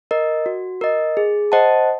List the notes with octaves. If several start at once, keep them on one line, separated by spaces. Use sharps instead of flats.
A#4 D#5
F#4
A#4 D#5
G#4
C5 D#5 F#5 A5